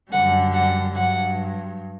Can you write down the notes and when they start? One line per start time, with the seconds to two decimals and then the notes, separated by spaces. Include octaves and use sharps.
0.11 F#2 D3 G3 F#5
0.54 F#5
0.95 G2 F#3 F#5